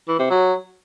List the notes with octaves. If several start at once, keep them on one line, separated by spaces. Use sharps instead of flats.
E3
C3
F#3